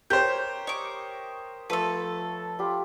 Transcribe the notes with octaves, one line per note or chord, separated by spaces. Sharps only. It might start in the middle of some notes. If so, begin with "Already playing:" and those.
G4 A#4 C5 C#5 G6
D#5 C#6 D6
F3 A3 A4 B4 E6
F4 G4 B5